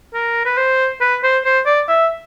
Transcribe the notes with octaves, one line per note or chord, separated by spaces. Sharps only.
A#4
B4
C5
B4
C5
C5
D5
E5